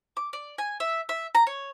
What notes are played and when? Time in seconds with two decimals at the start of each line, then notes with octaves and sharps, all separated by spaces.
0.17 D6
0.33 D5
0.58 G#5
0.80 E5
1.09 E5
1.35 A#5
1.47 C#5